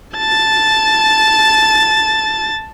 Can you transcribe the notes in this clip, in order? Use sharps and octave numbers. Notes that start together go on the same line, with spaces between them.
A5 A6